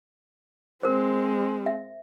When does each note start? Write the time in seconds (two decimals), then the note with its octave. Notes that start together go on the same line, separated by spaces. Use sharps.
0.83 G#3 C4 A#4 C5
1.66 E5